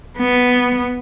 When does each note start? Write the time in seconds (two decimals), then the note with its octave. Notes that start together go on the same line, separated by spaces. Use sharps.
0.18 B3